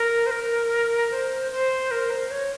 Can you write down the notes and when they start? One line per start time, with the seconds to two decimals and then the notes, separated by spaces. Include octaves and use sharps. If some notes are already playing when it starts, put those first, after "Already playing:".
Already playing: A#4
0.26 C5
0.31 A#4
1.11 C5
1.52 C5
1.91 A#4
2.11 C5
2.31 C#5